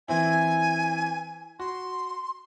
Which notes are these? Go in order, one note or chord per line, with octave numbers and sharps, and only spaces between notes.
E3 C4 E4 G#5
F#4 C6